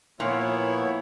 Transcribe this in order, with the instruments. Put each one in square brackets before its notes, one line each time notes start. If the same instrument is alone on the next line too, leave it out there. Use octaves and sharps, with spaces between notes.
[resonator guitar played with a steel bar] A#2 [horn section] F3 A#3 E4 [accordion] B3 C#5